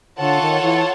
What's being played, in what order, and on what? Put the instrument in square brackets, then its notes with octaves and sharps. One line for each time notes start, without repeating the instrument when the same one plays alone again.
[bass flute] D3 [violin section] F4 A4 C#5 F#5 A5
[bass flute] D#3
E3